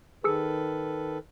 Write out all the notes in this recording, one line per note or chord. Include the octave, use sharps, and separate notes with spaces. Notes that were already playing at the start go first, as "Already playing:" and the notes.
D#3 G#4 A4 B4 E6 C#7